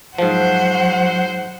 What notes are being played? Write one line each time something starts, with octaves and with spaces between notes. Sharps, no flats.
G#2 F3 F#3 C5 F#5